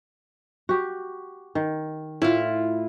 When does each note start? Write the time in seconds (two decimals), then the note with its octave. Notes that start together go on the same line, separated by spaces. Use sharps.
0.69 F#4 G4
1.55 D#3
2.22 A2 E4 F4